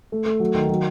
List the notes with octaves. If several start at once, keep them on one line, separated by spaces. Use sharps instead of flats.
A3
A3
F#3
D#3
F#3